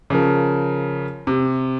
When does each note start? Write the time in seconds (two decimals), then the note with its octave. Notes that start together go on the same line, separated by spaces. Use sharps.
0.10 C#3 F3 A#4
1.27 C3